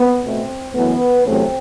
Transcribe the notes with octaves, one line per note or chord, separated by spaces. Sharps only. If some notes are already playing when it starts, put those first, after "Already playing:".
Already playing: B3
B2 A3 C4
F#2 E3 A3 B3
E2 C3 F#3 A3 C4